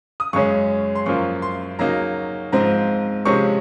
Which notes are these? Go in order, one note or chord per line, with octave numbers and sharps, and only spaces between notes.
D#6
F#2 C#3 G#3 C#4 C#6
C6
F#2 F3 A#3 F4 C#6
C6
C#3 F#3 A#3 D#4 A#5
G#2 F3 C4 F4 A#5
C3 F3 G#3 C#4 C#6